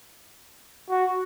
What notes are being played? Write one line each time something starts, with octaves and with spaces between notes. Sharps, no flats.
F#4